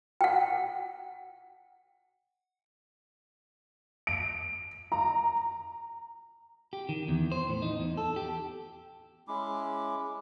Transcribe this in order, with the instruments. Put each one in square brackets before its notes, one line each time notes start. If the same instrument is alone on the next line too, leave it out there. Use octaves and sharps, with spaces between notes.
[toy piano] F#5 G5
[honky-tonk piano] D7
A#5
[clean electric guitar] G4
D#3
E2
C5
A2
D#4
E2
A4
G4
[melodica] G#3 C#4 E4 D6